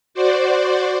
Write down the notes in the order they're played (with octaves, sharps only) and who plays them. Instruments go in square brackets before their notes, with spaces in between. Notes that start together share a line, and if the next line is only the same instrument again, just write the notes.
[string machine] F#4 C5 D5